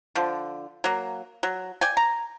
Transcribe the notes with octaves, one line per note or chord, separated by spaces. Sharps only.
D3 F3
F#3 A#3
F#3
D5 G5 G#5
A#5